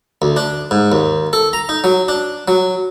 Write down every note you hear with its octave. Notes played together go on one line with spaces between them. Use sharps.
D2
D4
G#2
D#2
A4
A#5
D#4
F#3
D4
F#3